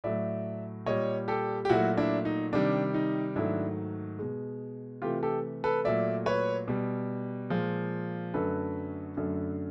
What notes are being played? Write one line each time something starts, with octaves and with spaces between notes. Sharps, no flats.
A2 F#3 A3 D5 E5
A#2 G3 C#5 D#5
G4 A4
G4
A#2 F#3 A3 E4 F#4
D4 E4
D#4
C3 D#3 G3 D4
D#4
G#2 D#3 F#3 A3 D4 E4
B2 G#3
C3 E3 A3 F4 G4
G4 A4
A4 B4
A#2 F#3 A3 D5 E5
B4 C#5
B2 G3
A#2 F3 G#3
F#2 D3 F#3 A3 A4 B4
F#2 D3 F#3 A3